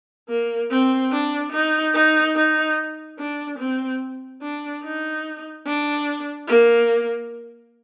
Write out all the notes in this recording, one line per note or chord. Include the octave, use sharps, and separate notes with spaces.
A#3
C4
D4
D#4
D#4
D#4
D4
C4
D4
D#4
D4
A#3